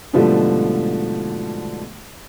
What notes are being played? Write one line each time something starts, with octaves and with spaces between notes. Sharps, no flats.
G#2 B2 D3 F3 G3 A3